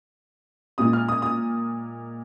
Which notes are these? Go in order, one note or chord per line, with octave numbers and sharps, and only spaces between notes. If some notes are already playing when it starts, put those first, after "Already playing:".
A#2 G#3 D#6
F6
D#6
D#6